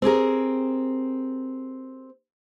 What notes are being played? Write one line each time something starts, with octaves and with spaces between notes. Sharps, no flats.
C4 G4 G#4 A#4